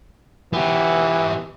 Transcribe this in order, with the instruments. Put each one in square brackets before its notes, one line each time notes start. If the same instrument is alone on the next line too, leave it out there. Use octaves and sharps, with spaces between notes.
[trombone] E3 [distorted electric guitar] B3 G4